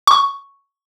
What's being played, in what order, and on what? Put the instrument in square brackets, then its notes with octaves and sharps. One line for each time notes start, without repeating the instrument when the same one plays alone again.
[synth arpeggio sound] C#6